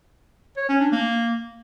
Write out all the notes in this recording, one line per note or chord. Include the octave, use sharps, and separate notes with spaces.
C#5
C#4
D4
A#3